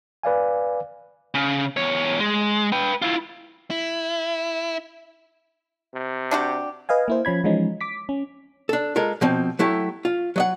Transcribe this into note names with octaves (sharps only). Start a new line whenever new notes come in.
B4 D5 F5 G#5
C#3
E2 C#5
G#3
B4 G5
E4 F4
E4
C3
D4 F#4 G4
B4 D#5 F5 G#5
A#3 E4 C5
F3 C#4 B5 G#6
E3 F3 G#3 C#4 D#4
D6 B6
C#4
D4 A4
G#3 F4 A4 A#4
B2 F3 C4
F#3 A3 E4 G4
F4
F#3 D#5 F#5